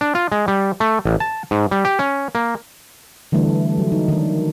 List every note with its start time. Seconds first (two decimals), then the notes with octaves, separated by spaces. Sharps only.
0.01 D4
0.15 F4
0.32 G#3
0.48 G3
0.80 A3
1.06 A1
1.20 A5
1.51 G#2
1.71 G3
1.85 G4
1.99 C#4
2.35 A#3
3.32 D3 E3 G3 A3 D4
3.78 F#3
3.92 D#4
4.08 D#3 D4